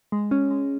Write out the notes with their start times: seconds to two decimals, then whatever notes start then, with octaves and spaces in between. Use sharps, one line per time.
0.12 G#3
0.31 C#4
0.51 G#3